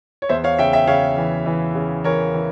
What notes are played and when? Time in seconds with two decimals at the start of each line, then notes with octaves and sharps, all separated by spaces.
0.22 C#5
0.29 E2 C5 E5
0.44 C#5 F5
0.58 C#3 E5 G5
0.73 E5 G5
0.87 C#3 C#5 F5
1.17 E3
1.46 E3
1.75 C#3
2.04 E3 A#4 C#5
2.34 E3